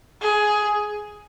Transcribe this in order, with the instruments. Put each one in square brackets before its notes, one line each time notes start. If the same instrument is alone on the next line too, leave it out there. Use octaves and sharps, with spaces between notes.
[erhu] G#4